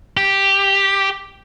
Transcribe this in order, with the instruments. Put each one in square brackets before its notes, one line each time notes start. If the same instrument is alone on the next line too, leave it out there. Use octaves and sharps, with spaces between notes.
[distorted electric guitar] G4